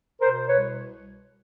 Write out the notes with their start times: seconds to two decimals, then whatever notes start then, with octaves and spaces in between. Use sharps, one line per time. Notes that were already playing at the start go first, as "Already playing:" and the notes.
0.20 B2 A#4 C5
0.48 C2 B4 C#5